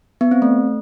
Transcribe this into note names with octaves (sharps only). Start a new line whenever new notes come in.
B3
C4
A3